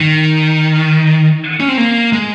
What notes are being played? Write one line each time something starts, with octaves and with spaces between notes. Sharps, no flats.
D#3
C#4
C4
A#3
G#3